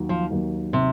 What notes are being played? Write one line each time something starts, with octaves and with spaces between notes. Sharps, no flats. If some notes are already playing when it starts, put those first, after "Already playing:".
Already playing: D#2 D#3 F#3
F3
D#2 D#3 F#3
C3